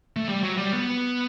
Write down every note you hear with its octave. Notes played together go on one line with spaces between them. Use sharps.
A3
G3
F#3
G3
B3